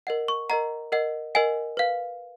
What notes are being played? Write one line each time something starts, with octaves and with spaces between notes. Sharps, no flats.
A#4 D#5 F#5
C#6
A#4 D#5 F#5 A#5
A#4 D#5 F#5
A#4 D#5 F#5 G#5
B4 F5